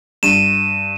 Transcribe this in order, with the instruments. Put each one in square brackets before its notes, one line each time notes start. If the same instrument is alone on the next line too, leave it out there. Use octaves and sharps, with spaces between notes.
[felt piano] G2 [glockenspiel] D#7 E7